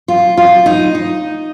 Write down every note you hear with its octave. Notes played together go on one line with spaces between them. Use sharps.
F4
F4
D#4
D#4